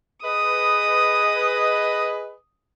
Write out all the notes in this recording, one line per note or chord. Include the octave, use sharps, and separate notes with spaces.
G#4 B4 D#5 D#6